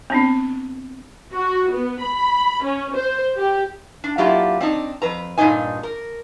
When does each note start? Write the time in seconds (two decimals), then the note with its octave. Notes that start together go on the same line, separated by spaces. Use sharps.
0.10 B3 C4 D4
1.32 F#4
1.70 B3
2.00 B5
2.62 C#4
2.96 C5
3.36 G4
4.04 D4
4.18 F#3 A#3 D4 E4 F4 G4
4.60 C4 D4 D#4
5.02 F2 B4 A#5
5.38 G2 A#2 D3 D4 D#4 G#5
5.83 A#4